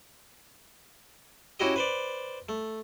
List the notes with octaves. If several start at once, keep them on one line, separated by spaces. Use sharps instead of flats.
C#4 D#4 E4 F#4 G4 D#5
B4 C5 D5
A3